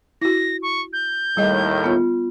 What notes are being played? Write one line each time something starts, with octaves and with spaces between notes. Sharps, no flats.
E4 F#4 A#6
C#6
G6
D#2 A2 G3 G#4 D#5
B3 F4